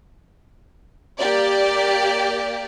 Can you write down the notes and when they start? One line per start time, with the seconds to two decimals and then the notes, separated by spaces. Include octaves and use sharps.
1.18 A#3 G4 D5